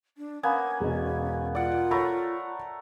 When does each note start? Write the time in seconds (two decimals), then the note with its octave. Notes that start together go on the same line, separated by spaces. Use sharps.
0.18 D4
0.43 A#3 B3 C#4 G#5
0.80 E1 B2
1.55 F4 D5 F#5
1.91 A3 C#5 A#5 B5